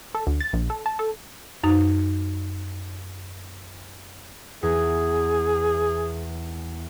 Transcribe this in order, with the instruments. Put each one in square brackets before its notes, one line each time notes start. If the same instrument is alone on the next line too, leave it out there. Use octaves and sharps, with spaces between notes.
[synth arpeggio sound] A4
D2
A6
A#1
A4
A5
A4
[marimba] F#2 D#4
[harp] E2 [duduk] G#4